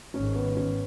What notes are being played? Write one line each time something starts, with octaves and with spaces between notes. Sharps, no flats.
G#1 G#2 D#3 C#4
B3
C#4